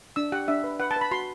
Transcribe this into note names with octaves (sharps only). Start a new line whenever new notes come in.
D4 E6
G4 F#5
D4 E5
B4
B4 F#5
A5
B4 B5
F#4 C6